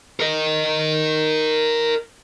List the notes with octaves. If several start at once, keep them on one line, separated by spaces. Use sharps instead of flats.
A#4 D#5